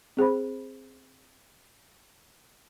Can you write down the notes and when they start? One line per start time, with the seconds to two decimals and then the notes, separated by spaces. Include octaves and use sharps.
0.17 C4 G#4 C5 B5